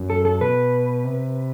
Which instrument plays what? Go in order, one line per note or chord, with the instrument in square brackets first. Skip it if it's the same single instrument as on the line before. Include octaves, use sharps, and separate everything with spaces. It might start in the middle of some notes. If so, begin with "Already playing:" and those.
Already playing: [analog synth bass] F#2
[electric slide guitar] A4
A4
[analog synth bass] B2 [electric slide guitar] B4
[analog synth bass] C3